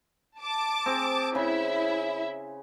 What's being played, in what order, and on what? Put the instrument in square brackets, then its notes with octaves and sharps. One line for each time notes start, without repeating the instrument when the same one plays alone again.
[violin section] A5 D6
[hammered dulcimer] C4 G#4
[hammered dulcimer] C#3 [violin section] E4 E5